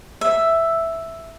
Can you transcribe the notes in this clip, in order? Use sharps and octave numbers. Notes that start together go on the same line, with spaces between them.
E5